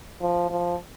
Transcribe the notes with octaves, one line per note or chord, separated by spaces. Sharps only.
F3
F3